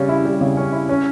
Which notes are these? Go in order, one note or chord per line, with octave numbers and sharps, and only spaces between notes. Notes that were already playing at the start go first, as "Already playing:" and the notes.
Already playing: C#3 G3 C#4
E4
G3
C#3
C#4
E4
C#4